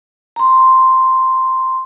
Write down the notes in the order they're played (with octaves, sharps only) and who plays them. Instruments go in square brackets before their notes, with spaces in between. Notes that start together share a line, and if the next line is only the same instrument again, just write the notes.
[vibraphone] A#5 C6